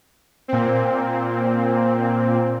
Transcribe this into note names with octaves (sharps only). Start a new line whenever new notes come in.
A#2 C4